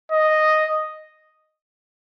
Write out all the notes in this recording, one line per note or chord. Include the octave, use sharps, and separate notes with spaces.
D#5